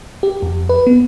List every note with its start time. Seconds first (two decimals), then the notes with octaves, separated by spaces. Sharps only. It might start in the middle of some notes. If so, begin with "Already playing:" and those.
0.23 G4
0.42 F2
0.69 B4
0.87 B3